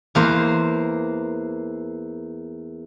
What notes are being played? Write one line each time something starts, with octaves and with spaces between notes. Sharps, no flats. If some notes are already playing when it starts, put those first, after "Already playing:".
E2 A#3 C5